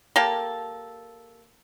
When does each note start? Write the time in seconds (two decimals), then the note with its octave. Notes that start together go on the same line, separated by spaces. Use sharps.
0.16 A#3 G4 A4